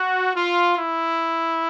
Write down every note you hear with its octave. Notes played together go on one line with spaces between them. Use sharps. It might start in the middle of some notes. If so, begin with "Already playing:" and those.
Already playing: F#4
F4
E4